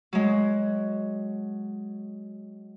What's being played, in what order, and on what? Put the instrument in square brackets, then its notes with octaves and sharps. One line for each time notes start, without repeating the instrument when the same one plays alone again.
[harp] F#3 G#3